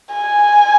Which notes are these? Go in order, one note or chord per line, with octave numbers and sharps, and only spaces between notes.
G#5